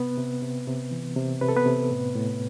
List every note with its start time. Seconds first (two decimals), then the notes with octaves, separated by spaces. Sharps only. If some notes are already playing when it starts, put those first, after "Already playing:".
Already playing: C3 B3 B4
0.18 C3
0.42 C3
0.67 C3
0.91 E3
1.16 C3
1.41 C3 B4
1.49 A4
1.56 B3 B4
1.66 C3
1.91 A2
2.15 A2